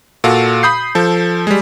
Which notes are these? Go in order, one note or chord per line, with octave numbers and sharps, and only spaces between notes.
A#2 F#4 A4 F5
B5 D#6 G6 C7
F3 A4
G3 G#3